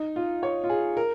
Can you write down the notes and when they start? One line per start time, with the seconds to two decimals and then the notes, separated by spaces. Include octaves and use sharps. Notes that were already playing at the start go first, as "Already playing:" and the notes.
Already playing: D#4
0.16 F4
0.43 C#5
0.64 F4
0.70 G#4
0.97 A#4